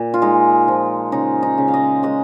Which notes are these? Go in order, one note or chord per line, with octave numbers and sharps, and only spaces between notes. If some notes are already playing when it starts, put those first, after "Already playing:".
Already playing: A#2
F4
G#3 D#4
F3
C#3 D#4
D#4
C#3
F5
D#5
G#3 D#5